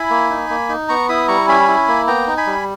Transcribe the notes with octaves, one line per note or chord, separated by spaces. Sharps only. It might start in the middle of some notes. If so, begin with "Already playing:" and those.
Already playing: E4 G#5 B5
A#3
D#4
A#3
D#4
B3 A#5 C#6
E4 B5 D#6
G3 A#5 C#6
C#4 G#5 B5
E4
A#3
B3 G5 A#5
D#4
G#5 B5
G3